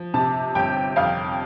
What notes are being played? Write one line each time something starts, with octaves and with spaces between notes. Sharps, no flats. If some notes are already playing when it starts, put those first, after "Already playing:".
Already playing: F3
C3 A5
G1 G5
F2 F5